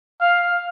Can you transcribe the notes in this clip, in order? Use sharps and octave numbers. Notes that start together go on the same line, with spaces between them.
F5